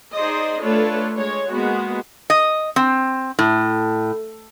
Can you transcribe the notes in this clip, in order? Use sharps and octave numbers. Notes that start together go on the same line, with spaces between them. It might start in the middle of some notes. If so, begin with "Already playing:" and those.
D#4 G#4 C5 D5 D#5
A3 D4 F4 A4 B4 C#5
G#3 C#5
G#3 A#3 B3 F#4
D#5
C4
A2